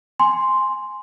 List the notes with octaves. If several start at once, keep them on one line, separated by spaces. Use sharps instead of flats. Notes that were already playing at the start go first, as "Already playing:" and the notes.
G#5 C6